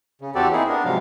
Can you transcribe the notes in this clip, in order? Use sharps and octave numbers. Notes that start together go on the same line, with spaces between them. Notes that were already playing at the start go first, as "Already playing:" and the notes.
C#3
E2 C4 F#4 G4 A4 D5
A#3 C4 D#4 E4 G#4
B3 D4 A#4
G#2 C3 F3 F#3 F5